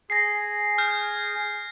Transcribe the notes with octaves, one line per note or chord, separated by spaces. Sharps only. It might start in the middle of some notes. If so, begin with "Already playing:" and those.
G#4 A#6 C7
F6 G6